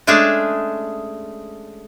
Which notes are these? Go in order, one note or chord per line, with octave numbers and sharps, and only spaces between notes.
G#3 A3 C#4 D4 G#4